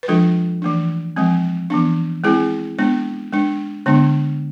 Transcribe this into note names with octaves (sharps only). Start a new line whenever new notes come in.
B4
F3 G#3 D4 F4 A4
E3 A3 D4
F3 G#3 C4
E3 B3 D4
G#3 C4 E4 G#4
G#3 B3 D4
G#3 D4
D3 G#3 B3 D4